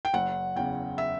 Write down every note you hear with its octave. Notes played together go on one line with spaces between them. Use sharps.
G5
F#1 F#5
E2 C#3 G5
E5